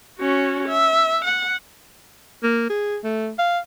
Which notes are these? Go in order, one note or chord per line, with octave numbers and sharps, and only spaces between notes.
C#4 F#4
E5
F#5
A#3
G#4
A3
F5